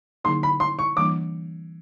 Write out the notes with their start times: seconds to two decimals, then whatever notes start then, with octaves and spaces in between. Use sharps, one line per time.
0.24 D3 F#3 A#3 D#4 G#4 C6
0.43 B5
0.60 C6
0.79 C#6
0.96 E3 G3 A#3 D4 D6